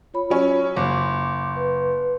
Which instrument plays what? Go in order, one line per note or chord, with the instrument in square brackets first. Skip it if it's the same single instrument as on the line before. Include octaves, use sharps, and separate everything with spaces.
[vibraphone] F4 C#5 B5
[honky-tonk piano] F#3 C#4
[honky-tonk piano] F#1 [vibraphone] D6
[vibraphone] B4